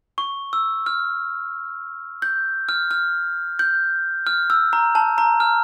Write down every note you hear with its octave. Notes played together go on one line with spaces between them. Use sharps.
C#6
E6
F6
G6
F6
F6
G6
F6
E6
A#5
A5
A#5
F6